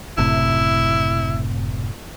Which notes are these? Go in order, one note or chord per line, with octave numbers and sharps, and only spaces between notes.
F#1 A2 C3 E4